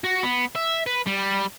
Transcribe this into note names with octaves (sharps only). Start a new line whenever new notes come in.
F#4
B3
E5
B4
G3